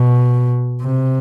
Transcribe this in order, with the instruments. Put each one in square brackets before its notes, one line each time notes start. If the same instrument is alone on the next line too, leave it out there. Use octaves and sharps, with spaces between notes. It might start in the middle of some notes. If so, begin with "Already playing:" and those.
Already playing: [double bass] B2
C3